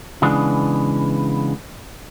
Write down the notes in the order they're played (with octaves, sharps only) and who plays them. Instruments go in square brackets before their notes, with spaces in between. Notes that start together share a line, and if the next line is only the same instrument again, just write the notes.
[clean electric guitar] C#3 E3 G#3 B3 D4